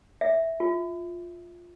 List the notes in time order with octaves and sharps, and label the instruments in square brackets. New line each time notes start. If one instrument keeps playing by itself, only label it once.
[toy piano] E5
F4